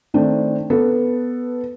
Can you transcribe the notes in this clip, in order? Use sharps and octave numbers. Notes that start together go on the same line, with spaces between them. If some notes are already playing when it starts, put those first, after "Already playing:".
D#3 A3 C4 D4
B3 A4 B4